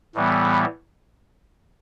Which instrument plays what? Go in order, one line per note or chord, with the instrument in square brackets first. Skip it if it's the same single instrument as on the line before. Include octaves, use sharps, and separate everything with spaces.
[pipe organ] A2 E3 G3 B3